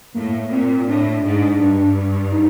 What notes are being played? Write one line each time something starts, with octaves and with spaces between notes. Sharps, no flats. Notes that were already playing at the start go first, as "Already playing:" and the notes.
A2 A#3
A#2 C4
A2 D4
G#2
G2
D#4